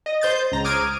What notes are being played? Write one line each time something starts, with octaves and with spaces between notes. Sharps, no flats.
D#5
C5 G6 A6
C#2 A#5
D6 D#6 F6 G#6 D7 D#7